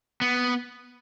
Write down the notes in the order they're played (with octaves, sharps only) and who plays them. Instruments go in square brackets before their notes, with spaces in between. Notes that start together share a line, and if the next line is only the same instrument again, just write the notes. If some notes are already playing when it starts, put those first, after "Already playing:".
[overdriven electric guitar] B3